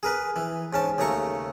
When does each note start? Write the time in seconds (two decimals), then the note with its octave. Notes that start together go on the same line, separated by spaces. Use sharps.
0.03 G#4 A#4 B4
0.36 E3
0.73 G#2 C#4 A5
0.98 D#2 C#3 A3 A#5 C#6